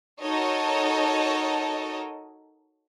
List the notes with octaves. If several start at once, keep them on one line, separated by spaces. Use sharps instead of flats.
D#4 F#4 A4 A#4 C#5 D#5